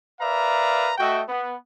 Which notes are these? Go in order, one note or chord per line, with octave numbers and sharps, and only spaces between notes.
A#4 B4 D5 E5 F5 A#5
A3 F#4 D#5 E5 G5
B3